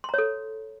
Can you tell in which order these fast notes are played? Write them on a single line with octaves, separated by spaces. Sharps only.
C6 A#5 C#5 A4